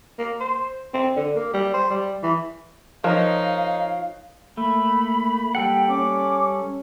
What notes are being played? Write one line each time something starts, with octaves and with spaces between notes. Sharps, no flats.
A#3
C5
C4
D3
A#3
G3
C5
G3
E3
F3 D#4 A#4 C#5 F5 F#6
A3 A#3 B5
G3 A4 F#5 G5
C#4 D6